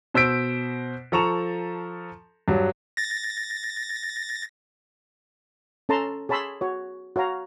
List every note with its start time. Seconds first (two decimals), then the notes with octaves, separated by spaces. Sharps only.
0.14 B2 C5 E6 B6 D7
1.12 F3 A4 A#5 C#6 E7 F7
2.48 G2 F#3
2.97 A6 A#6
5.89 C#4 A4 A5 A#5 C6
6.29 G#4 C#5 A5 B5 C6 E6
6.61 F#4 C#5
7.16 F#4 C#5 F5 A#5